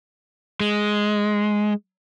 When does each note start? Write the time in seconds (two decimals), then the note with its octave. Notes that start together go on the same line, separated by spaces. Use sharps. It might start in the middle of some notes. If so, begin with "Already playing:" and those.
0.60 G#3